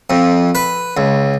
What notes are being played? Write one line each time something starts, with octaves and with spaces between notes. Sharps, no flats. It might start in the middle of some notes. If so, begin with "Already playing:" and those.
F2
B4
C#2